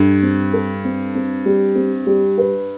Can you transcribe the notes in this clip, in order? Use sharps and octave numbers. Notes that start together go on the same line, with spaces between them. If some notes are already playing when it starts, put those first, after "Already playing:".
Already playing: G2 A4
C4
A4
C4
C4
G3
C4
G3
B4